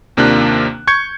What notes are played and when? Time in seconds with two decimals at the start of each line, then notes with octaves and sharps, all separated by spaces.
0.17 D#2 C3 A#3 D4 F4 F#6
0.87 C#6 G6 G#6 C#7